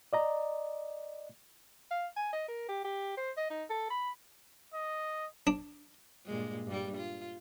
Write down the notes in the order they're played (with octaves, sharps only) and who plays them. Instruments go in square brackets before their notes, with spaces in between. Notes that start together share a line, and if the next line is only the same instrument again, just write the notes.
[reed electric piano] D5 D#5 A#5
[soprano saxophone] F5
G#5
D#5
A#4
G4
G4
C5
D#5
D#4
A4
B5
[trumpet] D#5
[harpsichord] D4
[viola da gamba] G2 A#2 G#3
G2 G3
F4